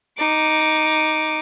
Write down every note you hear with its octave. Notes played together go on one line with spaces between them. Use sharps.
D#4 D6